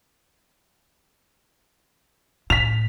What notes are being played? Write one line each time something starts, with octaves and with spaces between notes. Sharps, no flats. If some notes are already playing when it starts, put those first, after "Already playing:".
A2 B6 F7